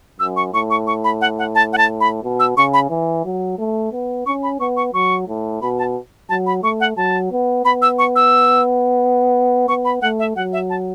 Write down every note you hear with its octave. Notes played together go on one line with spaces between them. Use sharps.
F#2 E6
C#6
A2 C#6
C#6
C#6
B5
F#5
F#5
A5
F#5
A5
B5
B2
E6
C#3 C#6
B5
E3
F#3
A3
B3
C#4 C#6
B5
B3 C#6
C#6
F#3 C#6
A2
B2 B5
A5
F#3 A5
B5
A3 C#6
F#5
F#3 A5
B3
B3 B5
E6
C#6
E6
B3 C#6
B5
A3 F#5
E5
F#3 F#5
E5
A5